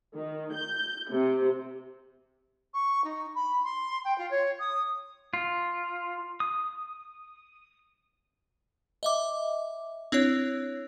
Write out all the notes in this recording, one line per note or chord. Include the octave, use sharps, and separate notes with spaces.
D#3
G6
C3
C#6
D#4
B5
C6
G5
F4
C#5
D#6
F4
D#6
D#5 E5 D6
C4 D4 E4 C#5